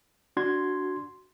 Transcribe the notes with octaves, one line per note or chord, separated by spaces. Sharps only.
D4 F#4 C6 G#6